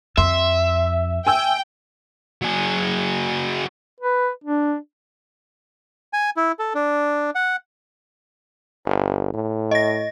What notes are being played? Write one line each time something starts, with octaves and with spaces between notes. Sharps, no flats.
F2 E5 C6
G5 G#5 E6
F#3 G#4
B4
D4
G#5
E4
A4
D4
F#5
G1
A2
D#5 A#6